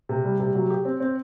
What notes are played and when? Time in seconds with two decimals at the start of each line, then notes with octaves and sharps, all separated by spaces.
0.09 C3
0.25 G3
0.40 C3
0.55 F#3
0.70 G4
0.85 C4
1.00 C4